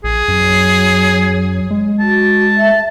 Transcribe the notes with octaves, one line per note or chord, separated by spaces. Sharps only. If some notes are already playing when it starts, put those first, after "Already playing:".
A#1 G#4
F#2 F#3
G#3
F#4 A5
E5